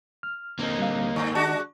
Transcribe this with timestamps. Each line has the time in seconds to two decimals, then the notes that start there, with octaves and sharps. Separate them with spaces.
0.23 F6
0.59 D3 A#3 C4 D#4
0.79 G3 F5
1.16 G2 D#3
1.35 G#3 D4 F#4 A5